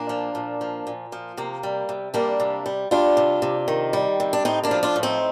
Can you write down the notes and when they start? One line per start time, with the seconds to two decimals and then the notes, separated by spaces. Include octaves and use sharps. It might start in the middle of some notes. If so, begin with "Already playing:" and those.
Already playing: A#2 A#3 D4
0.09 F3
0.35 A#2
0.61 F3
0.87 A#2
1.12 F3
1.37 C3 A#3
1.63 G3
1.89 C3
2.14 G3 A#3 D4
2.40 C3
2.66 G3
2.91 G3 D4 F4
3.17 C3
3.42 C3
3.68 D#3
3.93 G3
4.20 C3
4.33 D4
4.45 A2 C4 D#4
4.63 A#3 D4
4.71 F3
4.83 D4 F4
4.96 A2
5.03 C4 D#4